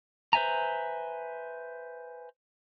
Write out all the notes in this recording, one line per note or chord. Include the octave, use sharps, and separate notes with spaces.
B4 C5 E5 G#5 A#5